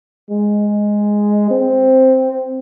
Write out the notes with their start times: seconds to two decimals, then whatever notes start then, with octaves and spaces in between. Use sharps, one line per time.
0.30 G#3
1.51 C4